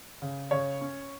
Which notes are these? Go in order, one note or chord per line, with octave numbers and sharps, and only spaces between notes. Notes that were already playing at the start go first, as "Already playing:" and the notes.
C#3
C#3 C#5
C#4